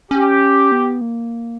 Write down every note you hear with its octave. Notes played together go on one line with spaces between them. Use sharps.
C#4 G4
B3
A#3